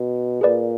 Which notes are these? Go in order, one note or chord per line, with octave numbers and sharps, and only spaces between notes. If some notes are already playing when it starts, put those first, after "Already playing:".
Already playing: B2
A#2 G#4 B4 D5